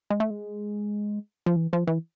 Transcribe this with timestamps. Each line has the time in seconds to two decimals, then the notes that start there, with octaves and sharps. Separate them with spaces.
0.10 G#3
0.20 A3
0.30 G#3
1.46 F3
1.56 E3
1.73 F3
1.87 E3